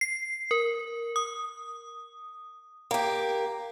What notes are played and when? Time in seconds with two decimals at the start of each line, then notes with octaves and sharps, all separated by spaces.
0.01 C7
0.51 A#4
1.16 D#6
2.91 A#3 G4